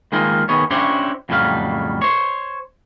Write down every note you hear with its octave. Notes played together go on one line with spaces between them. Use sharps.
D#3 G#3 A#3 D#4 F4
D#3 B3 G#4 C#5
C#4 D4 E4 G4 C5 C#5
F2 A2 C#3 F#3 G3 F5
C5 C#5